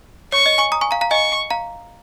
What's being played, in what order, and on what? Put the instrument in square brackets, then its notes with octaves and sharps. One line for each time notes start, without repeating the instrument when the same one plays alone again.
[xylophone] C#5 [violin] C#6
[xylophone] D#5
G#5 C#6
A#5 D#6
G#5 C#6
F5 A#5
F5 A#5
[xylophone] D#5 G#5 [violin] C#6
[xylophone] F5 A#5